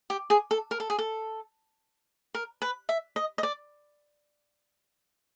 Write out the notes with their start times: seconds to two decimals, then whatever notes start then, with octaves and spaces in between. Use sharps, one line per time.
0.10 G4
0.30 G#4
0.51 A4
0.71 A#4
0.80 A4
0.90 G#4
0.98 A4
2.35 A#4
2.62 B4
2.89 E5
3.16 D#5
3.38 D#5
3.43 D5